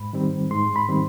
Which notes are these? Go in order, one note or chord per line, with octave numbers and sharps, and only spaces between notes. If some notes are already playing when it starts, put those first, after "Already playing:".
Already playing: G#2 B5
D#3 G3 C4
G#2 C6
B5
D#3 G3 C4